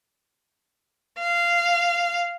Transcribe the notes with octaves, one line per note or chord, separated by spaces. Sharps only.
F5